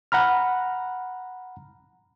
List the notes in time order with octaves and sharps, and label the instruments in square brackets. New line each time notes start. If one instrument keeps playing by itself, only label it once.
[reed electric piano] F#5 A#5 B5 F6